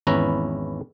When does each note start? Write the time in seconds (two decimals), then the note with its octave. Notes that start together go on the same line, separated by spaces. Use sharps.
0.07 G#1 E2 C#4 E4 B4 A#5